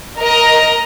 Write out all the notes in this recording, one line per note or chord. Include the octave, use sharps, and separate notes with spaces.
A#4 D#5 A#5